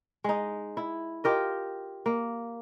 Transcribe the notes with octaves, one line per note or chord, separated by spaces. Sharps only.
G#3 D#4
E4
F4 G4 A#4 D#5
A#3